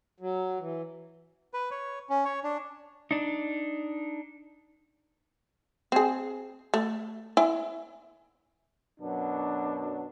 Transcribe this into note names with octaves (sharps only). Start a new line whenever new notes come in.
F#3
E3
B4
C#5
C#4
C#5
D4
D4 D#4
C4 G#4
A3
E4 G#5
F#2 B2 F#3 D4